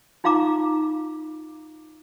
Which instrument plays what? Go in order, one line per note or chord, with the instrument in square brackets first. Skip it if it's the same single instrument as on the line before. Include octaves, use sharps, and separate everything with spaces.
[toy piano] D#4 F4 F5 A#5 D6